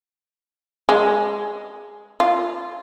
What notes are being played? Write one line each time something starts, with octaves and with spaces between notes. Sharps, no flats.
G#3
F4